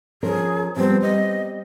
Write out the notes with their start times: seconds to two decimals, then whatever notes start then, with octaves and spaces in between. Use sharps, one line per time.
0.23 F3 C#4 G#4 A#4
0.77 F3 G3 B3 C4
1.02 G3 C4 D#5